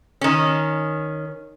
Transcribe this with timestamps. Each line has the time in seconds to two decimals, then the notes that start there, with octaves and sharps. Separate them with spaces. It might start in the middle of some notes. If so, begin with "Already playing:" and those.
0.21 D#3 C#4